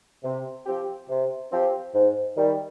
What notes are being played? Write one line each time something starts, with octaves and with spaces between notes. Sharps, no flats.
C3
F3 C4 G4
C3
F3 C4 G4
G#2
D#3 G3